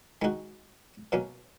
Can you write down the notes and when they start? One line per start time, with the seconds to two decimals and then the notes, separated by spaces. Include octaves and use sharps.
0.22 D#3 G#3 D#4 F#4
1.12 B2 F#3 A#3 C#4